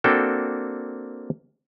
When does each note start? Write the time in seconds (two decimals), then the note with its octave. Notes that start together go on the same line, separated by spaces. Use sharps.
0.04 A#3 C4 D4 F#4 A4 G5